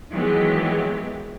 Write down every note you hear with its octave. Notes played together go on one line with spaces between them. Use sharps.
D#3 E3 F#3 G#3 B3 G4